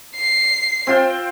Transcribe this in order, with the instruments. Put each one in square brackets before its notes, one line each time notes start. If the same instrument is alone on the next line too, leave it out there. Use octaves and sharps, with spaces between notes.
[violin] C7
[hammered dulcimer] C4 F4 G5